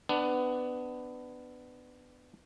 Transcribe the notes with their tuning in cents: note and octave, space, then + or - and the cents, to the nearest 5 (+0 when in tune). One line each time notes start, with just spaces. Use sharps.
B3 +20 D4 +20